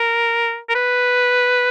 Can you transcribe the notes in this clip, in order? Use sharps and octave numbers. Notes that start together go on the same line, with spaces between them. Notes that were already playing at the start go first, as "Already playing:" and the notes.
Already playing: A#4
A#4
B4